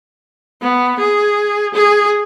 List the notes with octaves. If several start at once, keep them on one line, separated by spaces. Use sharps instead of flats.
B3
G#4
G#4